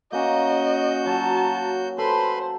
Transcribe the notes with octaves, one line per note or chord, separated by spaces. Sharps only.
A#3 C#4 F#4 D#5 G6
F#3 A5
A4 B4 C5 B5 C6